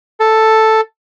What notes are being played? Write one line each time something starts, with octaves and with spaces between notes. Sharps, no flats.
A4